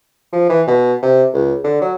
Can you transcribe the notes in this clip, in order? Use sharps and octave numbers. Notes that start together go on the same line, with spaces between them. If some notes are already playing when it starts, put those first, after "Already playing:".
F3
E3
B2
C3
C#2
D3
F#3